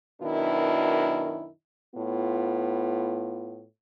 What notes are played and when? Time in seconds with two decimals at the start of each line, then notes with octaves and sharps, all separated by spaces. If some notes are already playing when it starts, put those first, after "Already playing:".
0.21 F#2 B2 D#3 D4 E4
1.95 A2 B3 F4